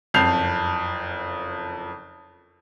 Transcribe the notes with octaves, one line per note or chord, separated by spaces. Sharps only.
F#1 F2 A5 G6 C7 F7